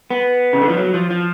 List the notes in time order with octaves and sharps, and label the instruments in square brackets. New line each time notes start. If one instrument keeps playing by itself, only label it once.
[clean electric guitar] B3
C#3
D3
F3
F#3
F3
F3